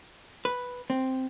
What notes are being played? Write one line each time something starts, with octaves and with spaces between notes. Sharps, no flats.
B4
C4